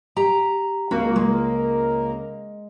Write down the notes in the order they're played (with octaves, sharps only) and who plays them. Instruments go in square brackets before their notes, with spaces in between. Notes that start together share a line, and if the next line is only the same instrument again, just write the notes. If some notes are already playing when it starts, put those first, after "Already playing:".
[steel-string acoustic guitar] G4 A#5
[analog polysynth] C#2 A#3 [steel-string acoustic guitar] F#4
[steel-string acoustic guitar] G#3